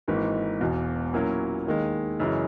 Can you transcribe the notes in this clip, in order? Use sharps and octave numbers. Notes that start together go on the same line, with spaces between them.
G#1 G#2 E3 A#3
E1 E2 B2
A#2 F#3 A#3 C#4 E4
D#2 D#3 G#3
F#2 C#3 E3 G#3